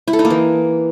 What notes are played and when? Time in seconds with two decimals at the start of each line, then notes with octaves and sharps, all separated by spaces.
0.08 E4
0.13 A4
0.19 D#4
0.25 A#3
0.30 E3